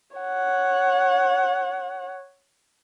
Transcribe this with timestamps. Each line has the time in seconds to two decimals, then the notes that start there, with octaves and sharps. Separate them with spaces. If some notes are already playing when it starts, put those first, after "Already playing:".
0.16 C#5 F#5